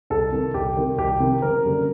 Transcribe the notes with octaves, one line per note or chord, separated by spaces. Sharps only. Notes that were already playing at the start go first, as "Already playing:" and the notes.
C2 A4
C3 D#3
C2 G4
C3 D#3
C2 G4
C3 D#3
F#1 A#4
F#2 D3 G3 A#3